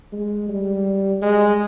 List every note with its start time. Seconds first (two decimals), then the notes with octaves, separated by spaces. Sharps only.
0.12 G#3
0.49 G3
1.22 G#3